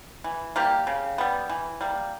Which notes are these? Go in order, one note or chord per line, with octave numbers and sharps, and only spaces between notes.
E3
G3 A#3 G4
C#3
G3 B3
E3
G3 A#3